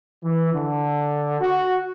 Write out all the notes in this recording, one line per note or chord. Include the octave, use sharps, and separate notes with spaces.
E3
D3
F#4